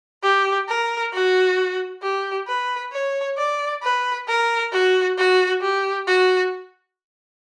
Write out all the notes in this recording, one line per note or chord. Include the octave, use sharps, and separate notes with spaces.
G4
A#4
F#4
G4
B4
C#5
D5
B4
A#4
F#4
F#4
G4
F#4